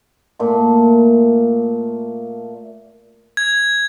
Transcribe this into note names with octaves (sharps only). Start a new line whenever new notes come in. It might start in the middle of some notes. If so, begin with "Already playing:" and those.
A#2 A3 C6
G#6